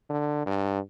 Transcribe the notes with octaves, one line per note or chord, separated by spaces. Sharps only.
D3
G2